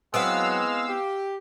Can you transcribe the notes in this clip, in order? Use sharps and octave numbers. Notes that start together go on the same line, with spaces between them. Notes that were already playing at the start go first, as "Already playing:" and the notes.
F#3 G#3 B3 C4 E4 F5 F#5 E6
G4